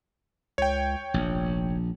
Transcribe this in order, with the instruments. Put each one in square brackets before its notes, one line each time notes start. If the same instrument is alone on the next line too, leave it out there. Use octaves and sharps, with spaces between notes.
[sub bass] C#2 [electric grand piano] C#5 G5
[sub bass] F1 [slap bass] A#1